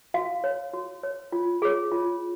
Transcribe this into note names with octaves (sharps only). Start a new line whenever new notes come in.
F#4 F5
C#5
F#4
C#5
F4
G#4 C#5
F4